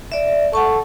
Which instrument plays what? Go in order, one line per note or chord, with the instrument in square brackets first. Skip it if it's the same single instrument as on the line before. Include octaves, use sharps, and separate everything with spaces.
[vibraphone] D5 E5
[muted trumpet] A4 [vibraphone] F#5 A5 C#6